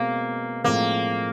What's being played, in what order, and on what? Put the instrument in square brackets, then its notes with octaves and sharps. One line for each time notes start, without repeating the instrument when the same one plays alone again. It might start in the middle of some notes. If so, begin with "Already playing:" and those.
Already playing: [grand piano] B2 G#3 C4 [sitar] A#3
[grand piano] A2 F3 G#3 C4 [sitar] A#3